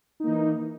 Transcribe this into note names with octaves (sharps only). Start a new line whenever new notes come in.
E3 A#3 D#4